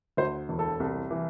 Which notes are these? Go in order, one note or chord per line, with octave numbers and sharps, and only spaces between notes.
D2 C5
E1
A4
C2
E3